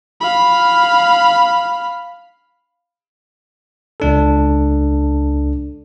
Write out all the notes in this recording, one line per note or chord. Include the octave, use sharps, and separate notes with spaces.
F5 B5
C#2 D4 A4